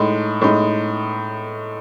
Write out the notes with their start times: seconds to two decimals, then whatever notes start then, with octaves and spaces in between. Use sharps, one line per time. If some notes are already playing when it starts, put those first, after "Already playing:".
Already playing: A2 G#3 D#4
0.41 A2 G#3 D#4